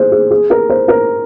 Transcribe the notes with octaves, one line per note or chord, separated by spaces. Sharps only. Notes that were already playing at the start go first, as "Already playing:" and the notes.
Already playing: G#4 C5
G#4
G#4
A#4
C5
A#4